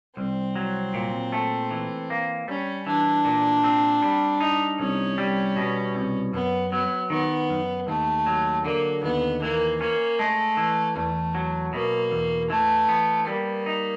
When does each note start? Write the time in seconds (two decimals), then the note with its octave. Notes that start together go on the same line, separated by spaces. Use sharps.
0.17 C2 C4
0.56 F#3
0.94 A#2
1.32 A3
1.71 E3
2.10 A#3
2.48 G3 C#4
2.87 E3 D4
3.25 A#2
3.64 C4
4.02 G3
4.41 D#4
4.79 C2 C#4
5.18 G3
5.56 B2
5.95 C2
6.33 F#2 B3
6.72 F#3 B3
7.10 D#3 B3
7.50 F#2
7.87 D#2 A3
8.26 F#3
8.65 D3 A#3
9.03 D#2 B3
9.42 E3 A#3
9.81 A#3 C#4
10.19 G#3 A3
10.57 E3
10.96 E2 A3
11.35 F#3
11.73 B2 A#3
12.11 E2
12.50 E3 A3
12.89 B3
13.27 G3 A#3
13.66 D#4